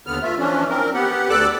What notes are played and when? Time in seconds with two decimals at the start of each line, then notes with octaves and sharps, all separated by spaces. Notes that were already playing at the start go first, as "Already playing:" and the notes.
0.07 D#2 D3 B3 F6
0.22 A3 F4 E5
0.38 E3 F3 C#4 D4
0.70 C4 A#4
0.94 B3 G4 F#5
1.30 D2 A4 D5 D6 E6 F#6